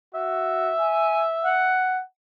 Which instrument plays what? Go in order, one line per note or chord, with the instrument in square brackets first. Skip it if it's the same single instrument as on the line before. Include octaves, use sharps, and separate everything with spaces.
[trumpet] F#4 [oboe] E5
[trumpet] G#5
F#5